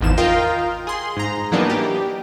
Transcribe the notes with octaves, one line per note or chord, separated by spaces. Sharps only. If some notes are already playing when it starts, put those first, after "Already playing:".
G#1 E2 G#2 F3 E7
F4 A#4 D#5 F5 G5
G#4 C6
G#2 A#5
E3 F#3 A#3 B3 D4 D#4
G4